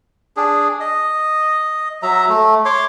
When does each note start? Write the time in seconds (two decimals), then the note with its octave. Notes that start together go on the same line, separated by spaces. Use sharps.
0.37 D4 G#4
0.80 D#5
2.03 F#3 E5 A#5
2.29 A3
2.65 C#5 C6 D6